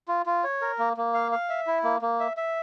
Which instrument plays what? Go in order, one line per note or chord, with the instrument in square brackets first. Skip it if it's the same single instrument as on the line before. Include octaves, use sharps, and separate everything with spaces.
[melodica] F4
F4
C#5
A#4
A#3
A#3
F5
F5
E5
E4
A#3
A#3
E5
E5